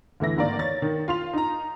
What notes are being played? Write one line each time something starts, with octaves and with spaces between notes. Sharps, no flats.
D2 D3 E3 E4 A#6
G#1 A#3 A#4 D5
C#5 A6
D#3
F4 C6 F7
D#4 A#5